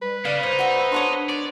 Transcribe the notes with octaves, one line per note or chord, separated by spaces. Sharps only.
G3 B4
C#3 D5 F5
D#4 C5 C#5
F#4 E5
D4 C#5 F#5 C6
C#5 D5